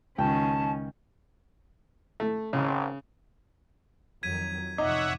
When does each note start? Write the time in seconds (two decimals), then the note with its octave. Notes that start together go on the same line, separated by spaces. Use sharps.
0.18 C#2 D#3 C#4 G5 A5
2.20 A3
2.53 G#1 C#3
4.23 F2 D#3 F#3 G#6 B6 D#7
4.78 A1 F2 C3 D#4 C#5 E5 F#5 D6